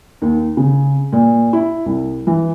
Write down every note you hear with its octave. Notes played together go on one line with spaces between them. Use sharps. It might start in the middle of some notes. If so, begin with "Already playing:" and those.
D#2
C#3
A#2
E4
C2
E3